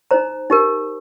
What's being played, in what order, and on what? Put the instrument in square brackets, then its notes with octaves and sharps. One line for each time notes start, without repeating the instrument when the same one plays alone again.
[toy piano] D#4 C5 A#5
D#4 G4 A#4